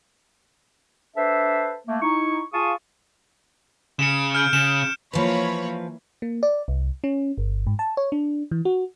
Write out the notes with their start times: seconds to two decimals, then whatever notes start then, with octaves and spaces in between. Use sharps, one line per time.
1.17 D4 A4 B4 C5 E5
1.88 A3 A#3
2.02 D#4 E4 C#6
2.54 F4 G#4 F5 A5 C#6 D#6
3.99 C#3 C#7 D7 E7
4.35 F6 G6 D7
4.53 C#3 E7
5.13 E3 F3 A#3 B4 C#5 B5
6.22 A#3
6.43 D5
6.68 C2
7.04 C#4
7.38 G1
7.67 G#2
7.79 A5
7.97 C#5
8.12 D4
8.51 E3
8.65 F#4